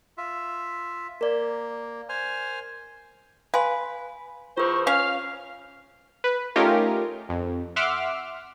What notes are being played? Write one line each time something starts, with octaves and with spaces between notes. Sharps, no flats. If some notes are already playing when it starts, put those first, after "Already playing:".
F4 E5
A#3 A#4 D5
C5 G#5 F6
B4 F5 G#5 C6
E2 F4 B4 C5 C#6
C#4 F5 F6
B4
A3 C#4 D#4 F4 G4 A#4
F2
E5 F#5 C6 D6 E6 F6